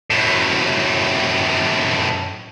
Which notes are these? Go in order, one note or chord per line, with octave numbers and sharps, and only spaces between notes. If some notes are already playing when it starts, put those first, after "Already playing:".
F#2 A2